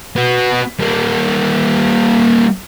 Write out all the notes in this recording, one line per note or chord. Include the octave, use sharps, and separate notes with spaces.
B3 F#4
G3 A#3